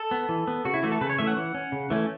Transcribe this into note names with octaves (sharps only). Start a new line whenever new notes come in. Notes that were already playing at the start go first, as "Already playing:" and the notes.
Already playing: A4
B3
E3
B3
C#3 F#4
E4
E3 A3 F#4
A4
C#3 B4
C#5
E3 A3 C#4 E5
F#5
E3
C#4
C#3
E3 A3 C#4